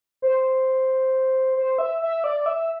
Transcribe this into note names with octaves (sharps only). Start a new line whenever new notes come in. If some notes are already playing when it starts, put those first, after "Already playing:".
C5
C5
E5
E5
D5
E5